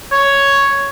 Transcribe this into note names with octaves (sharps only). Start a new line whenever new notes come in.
C#5